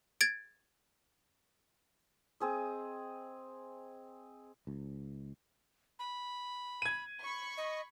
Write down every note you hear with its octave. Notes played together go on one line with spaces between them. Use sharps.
G#6 A6 D7
C4 G#4 D#5
C#2
B5
G#6 D#7
B5 C#6
D#5